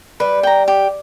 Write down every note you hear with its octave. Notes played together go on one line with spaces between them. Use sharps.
G3 B4
G5 A#5
G4